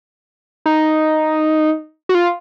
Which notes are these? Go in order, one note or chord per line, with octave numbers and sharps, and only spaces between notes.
D#4
F#4
F4